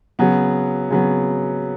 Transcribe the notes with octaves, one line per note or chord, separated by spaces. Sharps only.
C#3 F#3 B3
C#3 F#3 B3